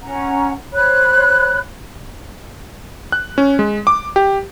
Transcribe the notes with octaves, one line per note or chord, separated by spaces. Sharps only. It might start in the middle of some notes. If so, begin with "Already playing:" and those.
C#4 F#5 A#5
C5 C#5 B5 F#6
F#6
C#4
G#3
D6
G4